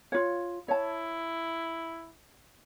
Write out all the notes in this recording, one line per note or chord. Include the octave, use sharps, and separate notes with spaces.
F4 C#5
E4 C#5 A5